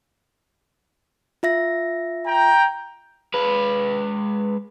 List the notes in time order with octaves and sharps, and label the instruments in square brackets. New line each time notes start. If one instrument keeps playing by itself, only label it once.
[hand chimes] F4 E5 A#6
[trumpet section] G5 A#5
[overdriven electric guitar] G#3 B4